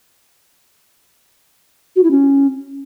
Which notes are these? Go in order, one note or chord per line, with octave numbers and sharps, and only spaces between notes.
F#4
E4
C#4